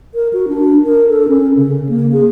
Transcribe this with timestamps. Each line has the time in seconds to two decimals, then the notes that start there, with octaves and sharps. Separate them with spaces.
0.15 A#4
0.33 F#4
0.48 D4
0.85 A#4
1.09 A4
1.28 C#4
1.57 C#3
1.89 A#3
2.12 G#4